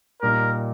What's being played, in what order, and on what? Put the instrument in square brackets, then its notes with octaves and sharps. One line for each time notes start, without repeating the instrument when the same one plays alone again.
[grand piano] A#2 G3 A#3 D#4 [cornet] A#4